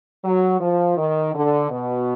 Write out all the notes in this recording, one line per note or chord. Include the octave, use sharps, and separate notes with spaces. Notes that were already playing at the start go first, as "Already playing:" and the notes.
F#3
F3
D#3
D3
B2